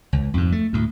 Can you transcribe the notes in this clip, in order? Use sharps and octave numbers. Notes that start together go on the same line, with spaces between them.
C#2
F2 G#2
A3
D2 A2